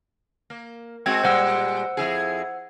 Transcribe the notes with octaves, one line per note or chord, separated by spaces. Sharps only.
A#3
G#3 C4 F#4 G5 G#6
A#2 G3 G#3 C5 F#5 E6
F2 E4 G#4